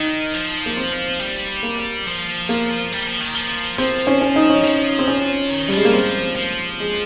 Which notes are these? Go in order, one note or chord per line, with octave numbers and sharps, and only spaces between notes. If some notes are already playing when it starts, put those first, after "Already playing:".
Already playing: D#3 D#4
F3
A#3
C4
G3
A#3
F3
A#3
G3
F3
D#3
F3
F3 C4
C#4
C#4
D#4
C#4
F3
C4
C#4
D#3
G3
F3 G#3
A#3
C4
F3
G#3